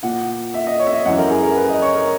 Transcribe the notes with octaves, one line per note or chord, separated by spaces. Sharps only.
A#2 F#5
E5
D#5
C#5
E5
D#5
F#2 E3 F#5
A#4
G#4
A#4
B4
D#5
C#5
A#4